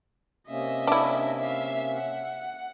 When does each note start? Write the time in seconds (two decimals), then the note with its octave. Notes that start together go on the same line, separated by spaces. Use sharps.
0.49 C3 A#3 C#4 D#5 E5
0.87 D4 E4
1.39 E5 F5
1.94 F#5